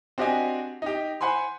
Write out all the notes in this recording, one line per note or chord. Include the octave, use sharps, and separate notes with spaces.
C4 D4 F#4 G4 D#5 G#5
D#4 G4
C5 F#5 G#5 B5 C6